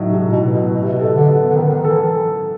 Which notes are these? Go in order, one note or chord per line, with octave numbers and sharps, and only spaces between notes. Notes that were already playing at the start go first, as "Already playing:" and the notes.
Already playing: A2 F#3 D#4
C3
A2
B2
B3
B2
B2 B3
C3
B2
C3
B2 A4
D3
B3
D3
D#3 B3
D3
D#3
E3 A4